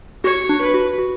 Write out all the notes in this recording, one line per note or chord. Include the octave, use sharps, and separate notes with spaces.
F#4 C#5
D4
B4
F#4
F#4